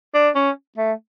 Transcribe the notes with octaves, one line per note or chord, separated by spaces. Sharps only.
D4
C#4
A3